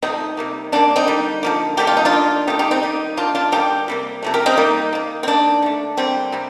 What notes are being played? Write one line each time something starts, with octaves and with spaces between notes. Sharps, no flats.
C3 F3 A3 C4 D#4
C3 G3 A#3
C3 G3 A#3 D4
C4 D#4
D3 G3 A#3
D3 F3 A#3
D3 G3 A#3 G4
F4
D#4
D4 F4
D#3 A#3
D#3 A3 D#4 G4
D#4 G4
C4 D#4
D#3 G3 A#3
D#3 G3 A#3 D4 F4
D4 F4
D3 G3 A#3 D#4 G4
C3 G3 A#3
C3 F3 A3
G4 A#4
C4 D#4
C3 G3 A#3
D#3 A#3
C4
D#3 A#3 D4
D3 A3
D3 G3 A#3 C4
C3 G3